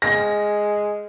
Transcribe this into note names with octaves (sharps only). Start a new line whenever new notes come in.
G#3 A#6